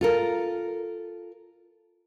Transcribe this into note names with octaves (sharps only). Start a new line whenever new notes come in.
F4 A4 A#4